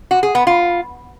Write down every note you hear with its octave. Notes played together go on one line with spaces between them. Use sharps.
F#4
G#4
B3
F4